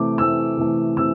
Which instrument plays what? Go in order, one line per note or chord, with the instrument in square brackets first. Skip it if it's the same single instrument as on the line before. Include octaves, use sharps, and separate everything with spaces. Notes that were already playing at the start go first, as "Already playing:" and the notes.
Already playing: [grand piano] C3 E3 A3 D6
C3 E3 A3 E6
C3 E3 A3
C3 E3 E6